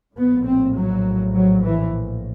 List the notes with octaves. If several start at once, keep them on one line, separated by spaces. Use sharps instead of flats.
A#1 A2 B3
C4
F#3
F#3
E3